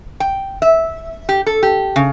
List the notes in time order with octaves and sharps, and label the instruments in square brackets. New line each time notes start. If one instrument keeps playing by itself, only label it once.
[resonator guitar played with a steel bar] G5
E5
G4
A4
G4
C#3